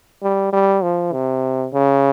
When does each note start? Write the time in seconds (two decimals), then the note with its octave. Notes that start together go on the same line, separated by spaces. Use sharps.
0.23 G3
0.53 G3
0.83 F3
1.13 C3
1.74 C#3